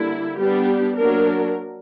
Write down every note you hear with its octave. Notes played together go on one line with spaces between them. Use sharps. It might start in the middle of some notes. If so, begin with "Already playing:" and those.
Already playing: D3 G3 A#3 D4 E4
G3 B3 D4 G4
F#3 A#3 D4 A#4